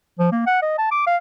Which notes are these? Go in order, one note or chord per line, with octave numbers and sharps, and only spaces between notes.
F3
A#3
F#5
D#5
A5
D6
F5